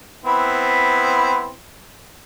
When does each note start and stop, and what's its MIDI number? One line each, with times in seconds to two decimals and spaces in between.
0.25 1.51 59
0.25 1.51 60
0.25 1.51 64